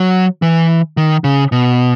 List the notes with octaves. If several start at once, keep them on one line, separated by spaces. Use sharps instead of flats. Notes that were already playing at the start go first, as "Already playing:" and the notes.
Already playing: F#3
E3
D#3
C#3
B2